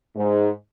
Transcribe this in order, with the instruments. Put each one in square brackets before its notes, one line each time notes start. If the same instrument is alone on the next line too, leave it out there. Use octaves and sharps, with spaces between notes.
[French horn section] G#2